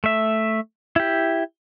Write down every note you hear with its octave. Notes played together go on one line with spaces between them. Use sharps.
A3 E5
E4 G4